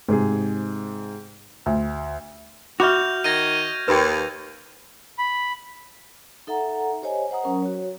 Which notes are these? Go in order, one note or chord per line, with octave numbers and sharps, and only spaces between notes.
G#2 C3 G#4
D2
F#4 E5 B5 D6 F6 G6 F7
D#3 D#5 G#6 A#6 D#7
D#2 B4 G5
B5
D#4 A4 E5 F#5 A#5
G4 C5 C#5 D#5 G#5
C5 F#5 A#5 D#6
F#3 C#4 A#4
F#4 C#5